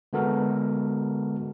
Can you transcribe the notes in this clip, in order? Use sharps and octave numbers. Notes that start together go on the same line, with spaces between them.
D3 G#3 B3 F#4 A4 A#4